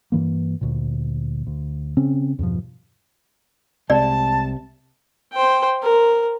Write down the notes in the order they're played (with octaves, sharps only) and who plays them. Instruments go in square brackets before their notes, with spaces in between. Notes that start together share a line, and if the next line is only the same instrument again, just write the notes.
[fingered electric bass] G2 E3 A#3
D2 A#2
D2
C#3 C4 C#4
E2 G2 B2 F3
[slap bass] C2 G#3 [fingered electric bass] C3 [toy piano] D5 [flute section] A5
[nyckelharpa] C5 G5
A#4